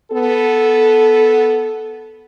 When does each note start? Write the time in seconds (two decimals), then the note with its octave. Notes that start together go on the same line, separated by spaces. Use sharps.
0.12 B3 A4